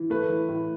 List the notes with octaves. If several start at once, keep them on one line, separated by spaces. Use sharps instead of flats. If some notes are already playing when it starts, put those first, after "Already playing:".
Already playing: E3
A3 B4
E3
A2